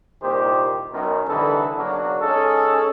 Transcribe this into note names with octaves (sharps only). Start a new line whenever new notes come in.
C2 A#2 D#3 D#4 G4 C5
F#2 B2 D#3
C2 D3 E3 D#4 A4 B4
B1 C#3 F#3 A#3 D4 F#4
G#3 C#4 D#4 G#4 A4